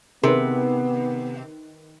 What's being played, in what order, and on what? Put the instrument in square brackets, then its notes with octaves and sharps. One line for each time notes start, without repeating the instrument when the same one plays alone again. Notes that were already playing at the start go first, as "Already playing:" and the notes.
[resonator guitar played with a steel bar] C3 [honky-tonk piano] D#3 B4 [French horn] B3 [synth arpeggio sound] G#4 A#4 C6